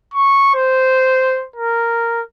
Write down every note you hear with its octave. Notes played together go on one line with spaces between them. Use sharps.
C#6
C5
A#4